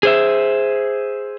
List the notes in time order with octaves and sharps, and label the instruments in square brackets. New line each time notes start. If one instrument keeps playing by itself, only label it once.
[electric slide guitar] G#4 C5 E5